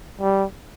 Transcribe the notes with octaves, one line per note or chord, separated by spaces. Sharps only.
G3